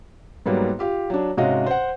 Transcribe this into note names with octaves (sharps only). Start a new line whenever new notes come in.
G#2 F#3 G3 A#3 B3
F4 G4 F5
F#3 D4
G#2 C3 C#4 F#4 D#5 F5
C5 F#5